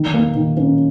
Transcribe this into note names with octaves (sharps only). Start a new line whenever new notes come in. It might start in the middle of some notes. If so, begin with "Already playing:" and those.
Already playing: D#3
A#3
D#3
C#4